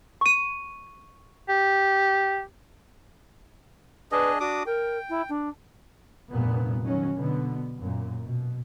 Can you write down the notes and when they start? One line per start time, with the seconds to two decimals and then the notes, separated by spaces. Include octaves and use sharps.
0.21 C#6 D#7
1.49 G4
4.12 D4 G#4 B4 D#5
4.40 D4 F#4 D6 D#6
4.66 A#4 G5
5.10 E4
5.29 D4
6.31 F1 G2 A#2 B3
6.83 D#3 F#3 C#4
7.14 B2 D3 B3
7.80 F#2 A#2
8.23 B2